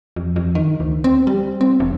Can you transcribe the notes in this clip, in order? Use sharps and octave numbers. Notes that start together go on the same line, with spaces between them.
F2
F2
D#3
D2
C4
G3
C4
E1